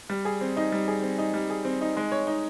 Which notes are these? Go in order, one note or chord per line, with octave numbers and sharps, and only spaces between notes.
G3
G#4
C4
D#4
G3
G#4
C4
D#4
G3
G#4
C4
D#4
G#3
C#5
D#4